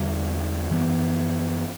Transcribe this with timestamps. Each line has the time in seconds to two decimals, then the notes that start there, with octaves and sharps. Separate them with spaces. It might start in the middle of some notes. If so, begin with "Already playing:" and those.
Already playing: E2 D3 G3
0.70 F#2 E3 B3